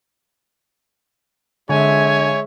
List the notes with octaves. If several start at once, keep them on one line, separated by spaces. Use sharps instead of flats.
D3 G#3 C#5 E5 G#5